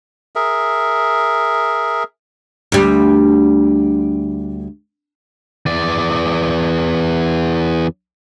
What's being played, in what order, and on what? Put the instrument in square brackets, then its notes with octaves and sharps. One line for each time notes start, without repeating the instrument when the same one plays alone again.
[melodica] G#4 A#4 E5
[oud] D2 G3
[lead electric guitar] E2 D5